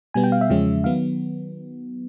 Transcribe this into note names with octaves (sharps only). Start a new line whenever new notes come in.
B2 G3 B3 G#5
G5
F5
E5
E2 C#3 F3 G#3 C#4
D#3 F#3 B3 F5